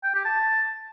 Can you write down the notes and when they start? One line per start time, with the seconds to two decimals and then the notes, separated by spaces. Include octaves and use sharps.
0.04 G5
0.14 G4
0.25 A5